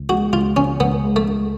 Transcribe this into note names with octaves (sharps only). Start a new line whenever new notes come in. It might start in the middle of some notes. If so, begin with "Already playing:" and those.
Already playing: C#2
G#3 F#4
C#2 F4
C#3 C#4
C#2 B3
G#3
A3
C#2